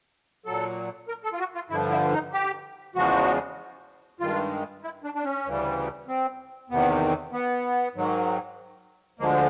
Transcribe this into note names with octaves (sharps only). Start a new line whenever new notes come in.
A#2 F#3 A4
A#4
A4
F4
F#4
F4
G2 D3 F3 E4
E4
D#4
G4
E2 C#3 F3 G#3 F#4
G2 D#3 G#3 F4
E4
D4
D4
C#4
D2 C#3 E3 G3
C4
E2 C3 D#3 B3
B3
G#2 D#3 F#3
D2 D3 F3 G#3 A#3